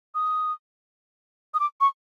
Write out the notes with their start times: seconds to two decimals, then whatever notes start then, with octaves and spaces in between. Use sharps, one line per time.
0.15 D#6
1.54 D#6
1.60 D6
1.81 C#6